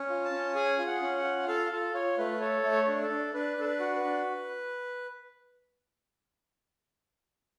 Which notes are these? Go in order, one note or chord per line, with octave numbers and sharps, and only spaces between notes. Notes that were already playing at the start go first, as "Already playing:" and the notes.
Already playing: C#4
F4
A5
C#4
G#4 G#5
F4
F#5
C#4
F#5
F4
A4 F5
F4 A4
F4 C#5
A3 B4
A4 C#5
A3
C#5
D4
A4
D4
D4 B4
D4 A4
B4
F#4
B4
D4